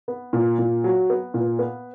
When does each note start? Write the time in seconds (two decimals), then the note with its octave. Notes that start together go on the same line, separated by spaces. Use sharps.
0.08 B3
0.33 A#2
0.59 A#2
0.84 F#3
1.10 B3
1.34 A#2
1.59 B3